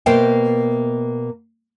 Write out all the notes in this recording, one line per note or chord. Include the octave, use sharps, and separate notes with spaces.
B2 A#3 C5 E5 G5